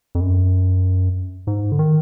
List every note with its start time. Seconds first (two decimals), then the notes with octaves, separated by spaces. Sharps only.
0.15 F2
0.20 F#2
1.47 G#2
1.72 D3
1.79 D#3